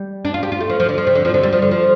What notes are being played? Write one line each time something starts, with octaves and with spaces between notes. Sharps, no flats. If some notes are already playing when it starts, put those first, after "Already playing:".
Already playing: G3
D4
F4
G4
F4
A3
F3
F3
D3
F3
C3
D3
F3
D3
G3
F3
D3
F3